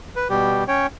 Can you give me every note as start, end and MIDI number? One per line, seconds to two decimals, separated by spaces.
0.16 0.28 71
0.30 0.64 47
0.30 0.64 55
0.30 0.64 67
0.68 0.87 61
0.68 0.87 73
0.68 0.87 79